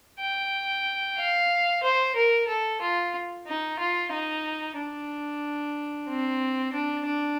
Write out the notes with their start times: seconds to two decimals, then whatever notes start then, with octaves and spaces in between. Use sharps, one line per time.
0.20 G5
1.18 F5
1.83 C5
2.16 A#4
2.48 A4
2.81 F4
3.47 D#4
3.80 F4
4.12 D#4
4.77 D4
6.08 C4
6.73 D4
7.06 D4